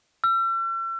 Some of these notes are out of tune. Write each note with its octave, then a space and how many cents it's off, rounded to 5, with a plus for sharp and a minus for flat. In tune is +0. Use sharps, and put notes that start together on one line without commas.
E6 +40